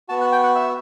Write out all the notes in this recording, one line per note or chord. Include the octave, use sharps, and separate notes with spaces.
B3 F#4 A5
F#5
G5
F#5
E5